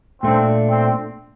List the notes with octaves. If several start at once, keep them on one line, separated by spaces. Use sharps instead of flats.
A#2 A3 C4 D4
C4